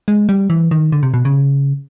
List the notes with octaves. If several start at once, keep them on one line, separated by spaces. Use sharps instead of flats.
G#3
G3
E3
D#3
D3
C3
B2
C#3